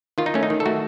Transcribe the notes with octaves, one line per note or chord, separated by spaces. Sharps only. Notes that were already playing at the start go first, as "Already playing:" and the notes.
D#3 F4
D#4
A3 C#4
D#4
D#3
A4
A3 F#4